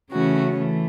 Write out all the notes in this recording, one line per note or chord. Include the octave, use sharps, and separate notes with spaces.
C#3 E3 A3 C#4 F#4
E3 A3